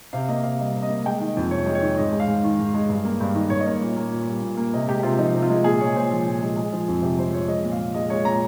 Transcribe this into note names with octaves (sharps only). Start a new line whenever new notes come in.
C3 F5
A#3 D#5
C3 F5
G3 D#5
C3
D#5
A#3
G#3 G5
D#3
D#5
F2
C3 C#5
G#3
C#5
D#3
G#2 D#5
G#3
F5
G#2
D#3
G#2
G#3
G2
A#3
G2
D#3 D#5
G2 C#5
D#5
A#3 C#5
A#2
A#3
A#2
G3
A#2
A#3
C3 D#5
G#3 G4
G4
C3 F4
F3 D#4
C3
F4
G#3
A#2 G#4
G#3 C#5
A#2 C5
F3
A#2
G#3
G#3 G#4
F3
F2
C3 G4
G#3 C5
F3 C#5
G#3 D#5
A#2
F5
A#2
G#3 D#5
G#3 C#5
A#2 A#5